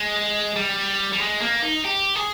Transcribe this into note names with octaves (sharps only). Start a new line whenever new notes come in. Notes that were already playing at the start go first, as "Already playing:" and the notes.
Already playing: G#3
G3
G3
G#3
A#3
D#4
G4
G#4